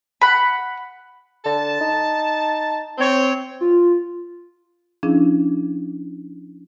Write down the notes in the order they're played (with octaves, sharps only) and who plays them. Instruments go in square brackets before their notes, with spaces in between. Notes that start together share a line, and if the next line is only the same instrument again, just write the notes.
[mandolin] F#5 B5
[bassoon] D3 [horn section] A5
[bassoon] D#4
[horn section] C4 C#5
[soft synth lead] F4
[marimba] F3 C#4 D4 E4 G#4